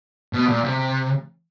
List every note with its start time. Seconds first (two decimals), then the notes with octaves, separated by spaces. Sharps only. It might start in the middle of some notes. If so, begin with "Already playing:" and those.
0.33 B2
0.48 A#2
0.64 C3